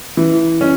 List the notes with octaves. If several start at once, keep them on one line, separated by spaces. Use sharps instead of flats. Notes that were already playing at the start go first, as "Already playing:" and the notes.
E3
C#4